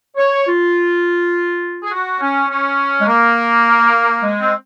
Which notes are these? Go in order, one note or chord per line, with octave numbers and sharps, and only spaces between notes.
C#5
F4
G#4
F#4
C#4
C#4
G#3
A#3
G#3
C4